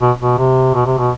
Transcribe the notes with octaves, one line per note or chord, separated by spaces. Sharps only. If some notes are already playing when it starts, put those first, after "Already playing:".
B2
B2
C3
B2
C3
B2